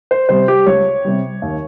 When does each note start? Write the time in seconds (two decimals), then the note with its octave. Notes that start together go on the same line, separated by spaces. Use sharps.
0.11 C5
0.29 C3 G3 C5
0.48 G4
0.66 C#2 C#5
1.05 C3 G3
1.42 D#2